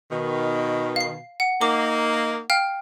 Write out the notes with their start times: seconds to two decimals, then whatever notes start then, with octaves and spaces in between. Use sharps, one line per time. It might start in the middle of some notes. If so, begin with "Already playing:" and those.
0.12 B2 D#3
0.96 F5 C7
1.40 F#5
1.61 A#3 D#4 D6
2.50 F5 G5 F6